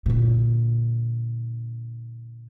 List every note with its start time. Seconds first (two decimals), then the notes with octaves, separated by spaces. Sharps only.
0.06 A#2 D3